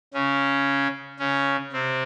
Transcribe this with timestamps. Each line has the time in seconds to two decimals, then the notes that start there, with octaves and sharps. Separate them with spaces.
0.13 C#3 C#4
1.19 C#3 C#4
1.72 C3 C4